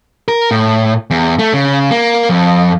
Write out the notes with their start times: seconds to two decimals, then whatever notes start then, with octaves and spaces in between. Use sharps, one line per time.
0.28 A#4
0.51 A2
1.11 E2
1.39 A3
1.54 C#3
1.91 A#3
2.30 F2